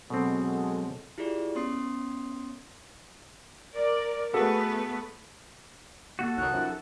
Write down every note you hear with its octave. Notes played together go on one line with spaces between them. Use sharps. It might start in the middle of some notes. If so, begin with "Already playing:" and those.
B2 F#3 G#3 C4 F#4 A4
E4 F4 G4 G#4 D5
B3 C#4 C#5 C6 D#6 C7
A#4 D5
A3 B3 F#4 G#4 A4 B4
A#3 F#4 A4
C2 D#3 C#4 E4 C#5 F#6
F#2 E3 F3 D#4